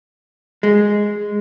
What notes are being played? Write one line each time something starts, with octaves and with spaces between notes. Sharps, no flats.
G#3